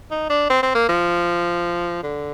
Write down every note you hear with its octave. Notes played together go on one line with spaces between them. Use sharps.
D#4
D4
C4
C4
A#3
F3
D3